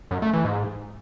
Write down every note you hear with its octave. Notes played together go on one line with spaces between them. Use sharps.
F#2
A3
E3
G#2